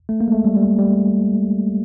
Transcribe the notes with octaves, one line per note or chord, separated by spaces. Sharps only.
A3
A#3
G#3
A3
G3
G3
G3